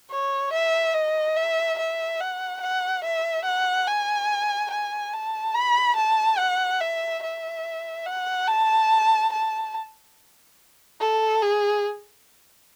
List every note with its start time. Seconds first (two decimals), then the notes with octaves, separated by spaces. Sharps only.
0.11 C#5
0.53 E5
0.94 D#5
1.37 E5
1.79 E5
2.21 F#5
2.61 F#5
3.04 E5
3.45 F#5
3.88 G#5
4.71 G#5
5.14 A5
5.55 B5
5.96 A5
6.38 F#5
6.81 E5
7.23 E5
8.06 F#5
8.48 A5
9.32 A5
11.00 A4
11.42 G#4